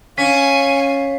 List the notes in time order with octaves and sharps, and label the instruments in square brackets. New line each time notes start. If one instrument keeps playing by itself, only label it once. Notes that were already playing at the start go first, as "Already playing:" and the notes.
[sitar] C#4 [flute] F5 [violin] G#5 C#7 [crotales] B6